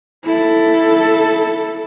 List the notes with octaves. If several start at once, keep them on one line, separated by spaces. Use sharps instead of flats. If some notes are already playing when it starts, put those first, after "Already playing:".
E4 A4